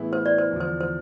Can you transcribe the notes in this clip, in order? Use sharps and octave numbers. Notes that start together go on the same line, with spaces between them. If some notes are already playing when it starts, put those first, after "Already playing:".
Already playing: A2 E3 B3 E4 G#4
C5
D5
C5
E2 D3 F3
C5
C5